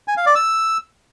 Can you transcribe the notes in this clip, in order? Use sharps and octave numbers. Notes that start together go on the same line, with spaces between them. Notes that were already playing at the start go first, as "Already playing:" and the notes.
G#5
F5
D5
E6